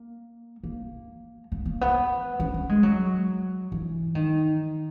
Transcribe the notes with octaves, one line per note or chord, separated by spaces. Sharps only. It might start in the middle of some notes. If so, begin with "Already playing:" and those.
Already playing: A#3
A#3
B3
A#3
B3
C#4
C#4
G#3
F#3
E3
D#3